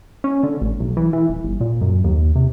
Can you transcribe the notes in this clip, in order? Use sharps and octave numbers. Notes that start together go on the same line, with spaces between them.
C#4
D3
A1
B1
E3
E3
D#1
G1
A#2
F#2
D#2
C3